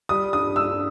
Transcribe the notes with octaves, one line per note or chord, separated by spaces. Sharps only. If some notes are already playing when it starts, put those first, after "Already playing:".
G3 D#6
G2 D#6
G2 E6